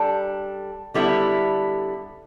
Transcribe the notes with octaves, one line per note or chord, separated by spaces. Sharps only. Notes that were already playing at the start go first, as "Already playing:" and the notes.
Already playing: G3 D4 A4
D3 G3 B3 E4 A4